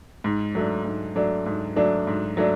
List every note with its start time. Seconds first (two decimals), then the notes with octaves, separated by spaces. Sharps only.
0.24 G#2
0.55 F#3 A3 D4
0.85 G#2
1.16 F#3 A3 D4
1.46 G#2
1.76 F#3 A3 D4
2.07 G#2
2.37 F#3 A3 D4